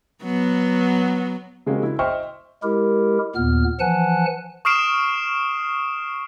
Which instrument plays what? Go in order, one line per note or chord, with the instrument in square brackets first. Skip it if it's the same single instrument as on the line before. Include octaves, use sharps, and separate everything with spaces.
[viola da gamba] F#3 B3
[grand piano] C#3 G#3 A#3 C4 C#4 F#4
C#3 E4
C5 D#5 E5 G5 C#6 F6
[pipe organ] G#3 E4 G4 A#4
D#2 A#2 B3 F6
E3 F3 F#5 G#5 A5 F#6
[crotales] C#6 D#6 F6 C7 D7 E7